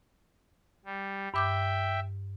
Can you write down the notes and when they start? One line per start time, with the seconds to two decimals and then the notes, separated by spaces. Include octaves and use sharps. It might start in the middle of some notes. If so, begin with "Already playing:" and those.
0.85 G3
1.34 G2 E5 G5 D6 G6